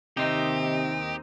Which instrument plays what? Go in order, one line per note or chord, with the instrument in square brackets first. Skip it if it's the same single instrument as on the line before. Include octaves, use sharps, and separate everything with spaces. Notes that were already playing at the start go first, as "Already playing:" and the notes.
[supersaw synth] D#2 D#3 D#5 [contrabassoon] C3 [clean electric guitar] C4 D#4 [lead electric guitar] G4